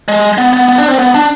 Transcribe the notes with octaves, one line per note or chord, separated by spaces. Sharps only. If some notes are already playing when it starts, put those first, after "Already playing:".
G#3
B3
B3
B3
D4
C4
B3
D4